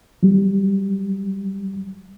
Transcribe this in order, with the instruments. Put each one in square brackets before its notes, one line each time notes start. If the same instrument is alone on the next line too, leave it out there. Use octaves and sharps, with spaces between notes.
[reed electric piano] F#3 G3